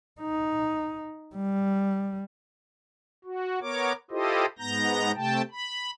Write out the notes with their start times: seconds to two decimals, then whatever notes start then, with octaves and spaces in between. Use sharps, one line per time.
0.21 D#4
1.35 G3
3.24 F#4
3.61 B3 A#4 C#5 D6
4.11 E4 F4 G4 A4 C5 D#5
4.59 G#2 B3 A#5 G6 A#6
5.16 C3 A3 G5 A5
5.51 B5